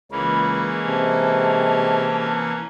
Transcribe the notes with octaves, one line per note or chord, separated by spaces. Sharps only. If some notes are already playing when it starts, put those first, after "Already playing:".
C#2 E3 G#3 A#3 C#4 B5
C3 A5